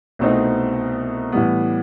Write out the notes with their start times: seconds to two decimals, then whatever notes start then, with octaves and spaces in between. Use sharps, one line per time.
0.19 C2 B2 A3 C4 D#4
1.32 A2 E3 G3 B3